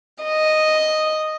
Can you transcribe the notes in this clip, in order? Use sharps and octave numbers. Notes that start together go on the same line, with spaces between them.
D#5